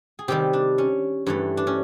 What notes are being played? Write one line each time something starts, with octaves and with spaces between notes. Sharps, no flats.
G#4
C3 D#3 G3 G4
D4
C#4
G2 E3 A3
D4
C#4